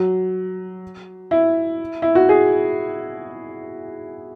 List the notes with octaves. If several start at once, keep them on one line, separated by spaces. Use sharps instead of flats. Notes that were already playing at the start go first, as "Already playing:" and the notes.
Already playing: F#3
E4
E4
F#4
G#4